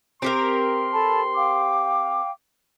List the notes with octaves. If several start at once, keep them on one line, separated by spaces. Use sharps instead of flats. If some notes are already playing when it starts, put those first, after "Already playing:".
C4 G4 A#4 C6
A4 A5 B5
F5 G5 D6